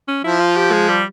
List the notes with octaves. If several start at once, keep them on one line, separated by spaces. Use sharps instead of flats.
C#4
F3 E4
F4
G4
G#3
G3